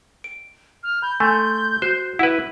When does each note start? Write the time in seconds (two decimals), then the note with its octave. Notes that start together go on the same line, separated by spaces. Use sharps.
0.24 D7
0.83 F6
1.02 B5 G6
1.20 A3 G#5 C6
1.82 F#4 C5 F#6
2.19 E4 B4 F#5